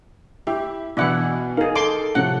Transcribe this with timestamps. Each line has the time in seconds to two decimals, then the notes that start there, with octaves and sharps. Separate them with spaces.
0.47 E4 G4
0.97 B2 E3 D4 E4 F#5
1.57 D#4 G#4 A#4 F5
1.76 A4 C6 D6
2.15 A2 C3 F3 F#5